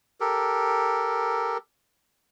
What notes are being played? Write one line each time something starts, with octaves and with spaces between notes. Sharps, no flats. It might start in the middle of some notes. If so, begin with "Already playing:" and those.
G4 A4 A#4